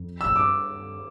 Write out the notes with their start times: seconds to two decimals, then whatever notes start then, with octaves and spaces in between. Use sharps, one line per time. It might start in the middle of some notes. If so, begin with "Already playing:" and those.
Already playing: F2
0.21 A2 E6
0.36 G2 D6